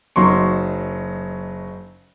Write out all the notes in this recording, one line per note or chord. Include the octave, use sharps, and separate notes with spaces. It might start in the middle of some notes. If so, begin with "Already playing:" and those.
F#1 F#3 D#4 C6 C#6